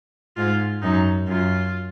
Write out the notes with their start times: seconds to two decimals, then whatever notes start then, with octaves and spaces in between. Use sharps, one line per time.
0.37 G#2 F4
0.83 F#2 D#4
1.28 F#2 F4